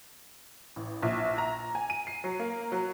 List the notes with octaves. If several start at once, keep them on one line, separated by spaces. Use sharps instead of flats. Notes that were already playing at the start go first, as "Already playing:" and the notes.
A1
A#1
A#5
G#5
D#7
C7
F#3
A#3
F#3